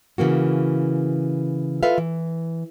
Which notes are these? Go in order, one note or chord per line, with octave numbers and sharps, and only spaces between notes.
C#3 E3 A#3 F#4
F4 A4 B4 E5 F5
E3